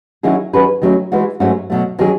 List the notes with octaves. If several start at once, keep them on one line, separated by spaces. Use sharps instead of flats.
D#3 F#3 C#4 E4 G#4
D#3 F#3 C#4 G#4 B4
D#3 F#3 A3 C#4
E3 G#3 D#4 F#4
G#2 F#3 A3 C#4 F#4
B2 F#3 A3
D#3 F#3 C#4 G#4